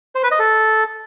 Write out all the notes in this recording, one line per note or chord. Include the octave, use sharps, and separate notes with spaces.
C5
B4
D#5
A4